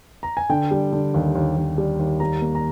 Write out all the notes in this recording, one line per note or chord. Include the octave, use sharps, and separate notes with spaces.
A#5
G#5
D3 G5
G3
D3
D#2
D#2
D#2
G3
D#2
G3 A#5
A#3
A#5